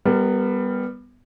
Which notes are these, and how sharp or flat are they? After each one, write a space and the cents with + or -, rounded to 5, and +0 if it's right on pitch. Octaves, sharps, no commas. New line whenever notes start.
G3 +15 B3 +0 A#4 -25